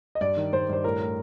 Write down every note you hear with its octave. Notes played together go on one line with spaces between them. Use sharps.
D#5
G2 D5
D#3
G2 C5
G2 C5
A2 A#4
A2